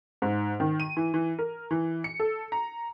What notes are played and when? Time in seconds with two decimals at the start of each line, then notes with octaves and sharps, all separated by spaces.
0.22 G#2
0.60 D#3
0.80 D#7
0.97 E3
1.14 E3
1.39 A#4
1.71 E3
2.04 C#7
2.20 A4
2.52 A#5